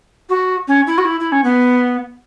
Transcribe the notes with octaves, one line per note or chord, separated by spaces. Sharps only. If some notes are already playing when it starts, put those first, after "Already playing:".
F#4
C#4
E4
F#4
E4
E4
C#4
B3